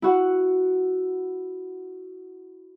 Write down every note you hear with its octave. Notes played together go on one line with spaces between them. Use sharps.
E4 F#4 F#5